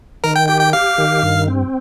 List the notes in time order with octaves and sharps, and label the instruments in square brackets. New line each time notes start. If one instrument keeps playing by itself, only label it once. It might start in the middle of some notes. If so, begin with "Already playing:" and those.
[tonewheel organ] D#3 [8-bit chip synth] A#4
[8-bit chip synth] G5
[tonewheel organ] G4 [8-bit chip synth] G5
[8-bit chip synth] G5
[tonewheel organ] G4 [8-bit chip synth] F5
[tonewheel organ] D#3
G2
C4